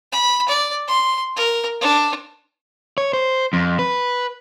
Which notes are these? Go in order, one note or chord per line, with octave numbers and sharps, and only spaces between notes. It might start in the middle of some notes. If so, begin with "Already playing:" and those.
B5
D5
C6
A#4
D4
C#5
C5
F2
B4